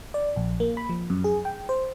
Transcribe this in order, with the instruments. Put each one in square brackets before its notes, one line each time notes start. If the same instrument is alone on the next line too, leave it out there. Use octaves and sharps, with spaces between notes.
[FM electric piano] D5
A#1
A#3
B5
F3
F#2
G#4
G5
C5